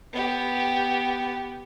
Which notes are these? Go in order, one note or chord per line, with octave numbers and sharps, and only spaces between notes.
B3 G4